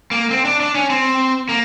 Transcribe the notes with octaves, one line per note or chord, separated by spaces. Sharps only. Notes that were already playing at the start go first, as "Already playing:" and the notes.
A#3
C4
D4
D4
C#4
C4
A#3